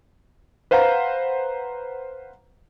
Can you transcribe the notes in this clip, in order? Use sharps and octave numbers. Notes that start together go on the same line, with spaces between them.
B4 C5 F5 F#5 A#5